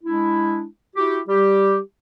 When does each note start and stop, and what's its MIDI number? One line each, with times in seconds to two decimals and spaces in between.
0.03 0.65 56
0.03 0.65 62
0.03 0.65 64
0.96 1.20 64
0.96 1.20 66
0.96 1.20 67
1.28 1.79 55
1.28 1.79 67